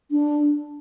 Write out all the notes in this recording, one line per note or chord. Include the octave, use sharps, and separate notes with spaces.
D4